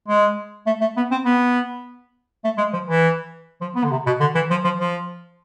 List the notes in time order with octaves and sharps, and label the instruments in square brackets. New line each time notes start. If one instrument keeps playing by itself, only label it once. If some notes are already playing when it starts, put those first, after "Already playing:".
[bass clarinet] G#3
A3
A3
B3
C4
B3
A3
G#3
F3
E3
F3
B3
D3
C3
B2
D3
E3
F3
F3
F3